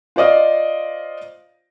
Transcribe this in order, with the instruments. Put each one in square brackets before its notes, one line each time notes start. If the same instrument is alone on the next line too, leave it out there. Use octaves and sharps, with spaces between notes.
[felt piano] F4 C5 D5 D#5 F5